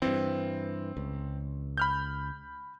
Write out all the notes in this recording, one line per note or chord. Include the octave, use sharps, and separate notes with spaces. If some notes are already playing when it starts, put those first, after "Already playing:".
G2 E3 C4
C#2
B5 F6 G6